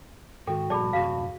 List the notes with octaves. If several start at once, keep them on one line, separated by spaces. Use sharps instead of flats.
G#2 D#3 F#4 A4 G5
A#2 F3 G3 G#4 D5 A5 B5
D#1 F#2 C3 F#4 F5